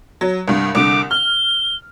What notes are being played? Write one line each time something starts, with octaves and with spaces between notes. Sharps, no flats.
F#3
C2 G2
C2 D3 D6
F6 G7